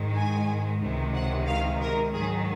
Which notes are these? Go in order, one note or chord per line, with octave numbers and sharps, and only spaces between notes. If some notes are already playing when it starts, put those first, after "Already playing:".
Already playing: G#2 D#3 G#3
G#5
C#2 C3 D#3 G#3
F#5
F5
A#4
G#2 D#3 F#3 G#4